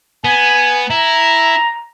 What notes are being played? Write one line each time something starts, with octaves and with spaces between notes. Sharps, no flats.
B3 G#5
E4 A#5